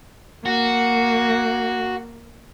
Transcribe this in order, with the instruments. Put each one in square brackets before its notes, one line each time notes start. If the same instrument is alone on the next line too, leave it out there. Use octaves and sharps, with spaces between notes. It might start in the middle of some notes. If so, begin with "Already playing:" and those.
[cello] A#3 [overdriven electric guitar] F#4